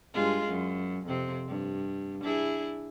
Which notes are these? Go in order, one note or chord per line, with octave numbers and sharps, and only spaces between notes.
G2 G#3 F4
F#2
F2 C3 C4
G2
D4 E4 G#4